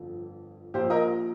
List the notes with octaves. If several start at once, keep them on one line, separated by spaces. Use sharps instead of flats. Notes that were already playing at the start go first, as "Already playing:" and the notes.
Already playing: G1 F2 F3
A#1 A#2 F3 G4 C5
A#4 D#5